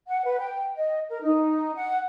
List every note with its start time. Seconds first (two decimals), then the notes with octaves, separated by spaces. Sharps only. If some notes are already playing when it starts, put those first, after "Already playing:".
0.09 F#5
0.24 B4
0.39 G5
0.76 D#5
1.09 A#4
1.23 D#4
1.76 F#5